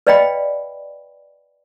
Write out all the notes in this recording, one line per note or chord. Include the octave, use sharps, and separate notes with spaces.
B4 D5 D#5 F5 G5 B5